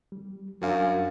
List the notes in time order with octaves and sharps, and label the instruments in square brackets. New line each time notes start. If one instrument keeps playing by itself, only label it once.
[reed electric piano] G3
[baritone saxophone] F#2 [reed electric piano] F#3 D4 F5